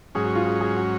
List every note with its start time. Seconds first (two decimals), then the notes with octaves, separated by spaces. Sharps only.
0.15 G#2 F#3 C#4 G#4
0.25 F#4
0.36 F4
0.46 G#4
0.61 G#4
0.76 F#4